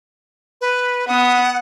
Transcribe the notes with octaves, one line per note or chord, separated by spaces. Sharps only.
B4
B3 F#5 D#6